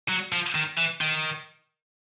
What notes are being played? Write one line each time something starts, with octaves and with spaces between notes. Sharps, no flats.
F#3
F3
D#3
E3
D#3